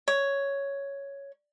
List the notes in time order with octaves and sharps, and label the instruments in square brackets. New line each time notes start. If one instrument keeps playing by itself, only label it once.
[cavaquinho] C#5